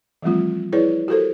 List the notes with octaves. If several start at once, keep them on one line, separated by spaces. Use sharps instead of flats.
E3 F3 G3 A3 C4 F4
E4 G#4 B4 C#5 D5
F#4 G4 A4 A#4 C5